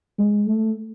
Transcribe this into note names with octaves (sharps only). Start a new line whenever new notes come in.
G#3
A3